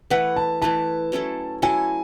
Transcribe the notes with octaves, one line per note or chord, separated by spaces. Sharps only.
E3 A3 E4 B4 F#5
A5
E3 A3 E4 B4 A5
F#3 C#4 E4 A4
F#3 C#4 E4 A4 G#5